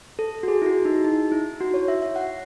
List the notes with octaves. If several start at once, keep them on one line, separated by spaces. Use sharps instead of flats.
A4
F#4
G#4
E4
F#4
D#4
D#4
E4
F#4
C#5
E5
E5
F#5